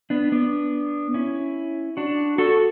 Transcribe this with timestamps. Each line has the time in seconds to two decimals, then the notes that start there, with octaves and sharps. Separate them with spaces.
0.10 B3 D4
0.32 B3 D4
1.14 C#4 E4
1.97 D4 F#4
2.38 F#4 A4